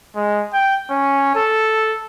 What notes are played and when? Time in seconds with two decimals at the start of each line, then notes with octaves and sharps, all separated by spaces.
0.16 G#3
0.54 G5
0.90 C#4
1.36 A4